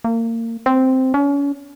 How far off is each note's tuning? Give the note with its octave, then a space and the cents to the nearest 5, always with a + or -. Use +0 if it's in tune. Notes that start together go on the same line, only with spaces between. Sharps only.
A#3 -30
C4 -5
C#4 +35